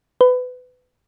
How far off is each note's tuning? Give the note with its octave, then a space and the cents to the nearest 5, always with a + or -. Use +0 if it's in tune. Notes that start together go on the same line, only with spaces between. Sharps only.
B4 +25